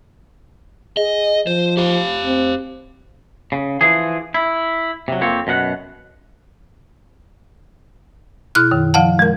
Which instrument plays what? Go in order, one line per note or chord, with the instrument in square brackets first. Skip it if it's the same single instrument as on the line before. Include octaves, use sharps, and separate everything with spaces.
[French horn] G#4 [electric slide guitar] D#5
[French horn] F3 [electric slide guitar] C5
[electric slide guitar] G4 F5
[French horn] C4
[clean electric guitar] C#3
E3 F3 G#4
E4
C3 F#3
F2 F3 A#3 C4 C#5
F#2 B2 A#4 F#5
[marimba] B2 E4 F6 F#6
F#2 D#3
F3 F5 F#5 A5
G#3 A#4